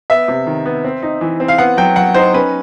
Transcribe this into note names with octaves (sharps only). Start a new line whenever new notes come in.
B3 E5
C3
D#3
B3
C4
D#4
E3
C4
F5
B3 F#5
F#3 G5
F#3 F#5
D#4 C5
C#4 B4